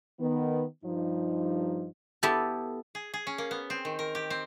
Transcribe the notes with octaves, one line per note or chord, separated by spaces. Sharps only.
D#3 B3
G2 F3 D#4
B3 E4 G4 A4
G#4
G#4
C#4
A#3
B3
C4
D#3
A#4
G4
C4